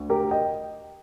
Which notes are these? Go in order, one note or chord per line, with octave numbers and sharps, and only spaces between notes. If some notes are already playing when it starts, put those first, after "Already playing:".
Already playing: D2
G4 A#4
D#5 G5